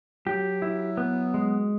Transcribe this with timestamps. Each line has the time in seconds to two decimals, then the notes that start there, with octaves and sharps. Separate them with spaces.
0.26 F#3 G4
0.62 E4
0.97 B3
1.34 G#3